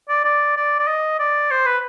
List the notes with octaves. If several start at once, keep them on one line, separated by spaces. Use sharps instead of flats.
D5
D5
D5
D5
D#5
D5
C5
B4